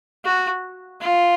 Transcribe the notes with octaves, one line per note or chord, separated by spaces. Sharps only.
F#4
F4